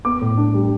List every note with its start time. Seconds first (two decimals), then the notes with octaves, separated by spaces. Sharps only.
0.05 B3 D6
0.21 A2
0.37 D4
0.54 G3